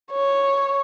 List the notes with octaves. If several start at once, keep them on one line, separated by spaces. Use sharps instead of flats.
C#5